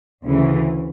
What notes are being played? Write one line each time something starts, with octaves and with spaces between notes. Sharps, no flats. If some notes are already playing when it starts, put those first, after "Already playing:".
D2 C#3 E3